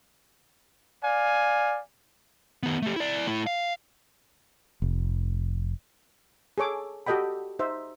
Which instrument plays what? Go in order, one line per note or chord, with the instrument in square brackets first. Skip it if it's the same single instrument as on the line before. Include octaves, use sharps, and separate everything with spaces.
[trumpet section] D5 F5 G#5
[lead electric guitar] D#3 B3
A3 G4
E4 D5
A3 E4
F5
[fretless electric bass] F1
[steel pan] G#4 A4 C#5 D6
F#4 G4 A4 D#5 G5 B5
D#4 C5 E5